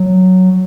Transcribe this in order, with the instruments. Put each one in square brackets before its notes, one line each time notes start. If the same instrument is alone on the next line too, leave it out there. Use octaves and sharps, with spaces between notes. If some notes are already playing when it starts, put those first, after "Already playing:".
Already playing: [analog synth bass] F#3